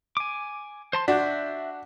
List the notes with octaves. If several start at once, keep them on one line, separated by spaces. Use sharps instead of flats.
G#5 D6
C5 A5 C6
D4 F#4 E5 G6